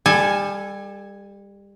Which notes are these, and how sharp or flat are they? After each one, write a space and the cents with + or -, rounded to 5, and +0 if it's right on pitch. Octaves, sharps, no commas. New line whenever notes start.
G3 +30 A4 -5 G#5 +0